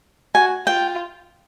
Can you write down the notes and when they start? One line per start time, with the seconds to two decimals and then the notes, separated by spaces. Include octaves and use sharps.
0.35 F#4 G#5
0.67 F4 G5